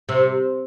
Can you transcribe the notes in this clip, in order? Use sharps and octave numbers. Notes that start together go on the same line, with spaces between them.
C3